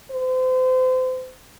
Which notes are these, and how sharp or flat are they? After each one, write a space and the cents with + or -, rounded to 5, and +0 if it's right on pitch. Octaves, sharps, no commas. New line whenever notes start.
C5 -35